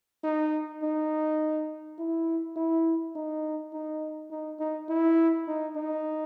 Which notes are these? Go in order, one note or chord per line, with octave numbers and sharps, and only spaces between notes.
D#4
D#4
E4
E4
D#4
D#4
D#4
D#4
E4
D#4
D#4